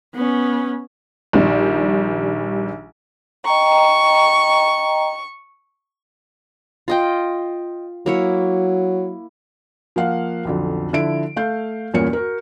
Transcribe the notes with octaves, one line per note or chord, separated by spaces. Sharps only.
B3 C#4
A#1 D#3 G3
D#5 G5 A#5 C#6
F4 D#5 G5
F#3 A#3 E4 C#5
F3 A#3 F5 F#5
B1 F2 D3
D3 F3 E4 D7
A3 F5 G6
E2 G2 A#2 A#3 C#4 C#7
F#4 A#4